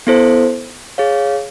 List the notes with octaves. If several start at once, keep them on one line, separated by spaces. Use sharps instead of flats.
B3 E4 A4 C5
G#4 C#5 F5